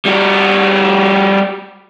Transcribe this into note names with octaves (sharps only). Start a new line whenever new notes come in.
G3 F#4